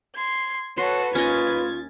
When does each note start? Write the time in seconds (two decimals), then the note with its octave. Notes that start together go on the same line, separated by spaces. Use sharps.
0.15 C6 G#6
0.78 F#4 A4 B4 C#5 C6
1.15 D#2 C#4 F4 D#5 G#6 A6